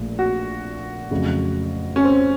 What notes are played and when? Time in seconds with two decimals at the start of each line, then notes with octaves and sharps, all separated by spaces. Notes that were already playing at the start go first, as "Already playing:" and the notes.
Already playing: A#1 A#2 A3
0.19 F#4
1.11 F2 C#3 F#3 A3
1.96 C#4
2.04 C4